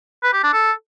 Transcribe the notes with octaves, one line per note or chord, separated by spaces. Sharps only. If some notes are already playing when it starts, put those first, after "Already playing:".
B4
G4
D4
A4